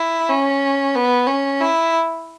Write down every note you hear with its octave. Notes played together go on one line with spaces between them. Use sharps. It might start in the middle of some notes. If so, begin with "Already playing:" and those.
Already playing: E4
C#4
B3
C#4
E4